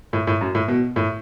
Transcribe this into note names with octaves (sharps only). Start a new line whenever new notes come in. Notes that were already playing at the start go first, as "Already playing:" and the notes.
A2
A2
F#2
A2
B2
A2